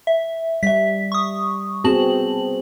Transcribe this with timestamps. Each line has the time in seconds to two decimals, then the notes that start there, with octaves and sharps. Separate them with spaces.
0.07 E5
0.63 G3 E5 B6
1.12 C#6 D#6
1.84 B3 C4 F#4 G#4 A5 F#7